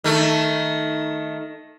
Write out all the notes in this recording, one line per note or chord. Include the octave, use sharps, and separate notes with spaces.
D#3 A3